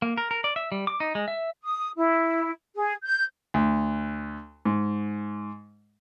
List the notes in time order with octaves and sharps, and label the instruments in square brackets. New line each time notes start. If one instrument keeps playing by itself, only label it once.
[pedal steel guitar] A#3
A#4
A#4
D5
E5
G3
D6
D#4
G#3
E5
[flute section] D#6
E4
G#4
G6
[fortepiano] D2
G#2